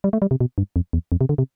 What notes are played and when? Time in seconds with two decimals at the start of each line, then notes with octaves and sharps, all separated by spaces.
0.04 G3
0.13 A3
0.22 G3
0.31 C3
0.40 B2
0.58 G2
0.76 F2
0.93 E2
1.12 F2
1.21 C3
1.29 D3
1.38 C3